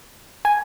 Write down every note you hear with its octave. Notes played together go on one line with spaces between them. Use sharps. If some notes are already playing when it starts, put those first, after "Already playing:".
G#5